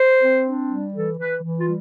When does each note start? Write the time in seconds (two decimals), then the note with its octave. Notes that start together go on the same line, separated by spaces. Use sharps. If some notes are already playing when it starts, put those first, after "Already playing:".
Already playing: C5
0.19 C4
0.43 D4
0.67 G3
0.92 E3 A4
1.16 E3 B4
1.41 E3
1.58 F4
1.66 G3